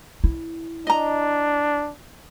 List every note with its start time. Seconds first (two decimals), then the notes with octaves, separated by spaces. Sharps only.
0.24 E4
0.87 D4 D#5 A#5